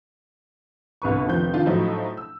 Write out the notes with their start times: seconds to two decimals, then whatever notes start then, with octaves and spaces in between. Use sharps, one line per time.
1.02 G1 C2 B4 C#6
1.26 F1 D#3 F3 G6
1.54 D#3 D4 F4
1.66 A2 F3 F#3 D#4 E4
2.17 E6